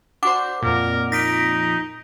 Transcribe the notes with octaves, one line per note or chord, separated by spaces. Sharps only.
D4 F#4 C5 F#5 D6
F2 A#2 A#4
D#4 A#6 B6 D7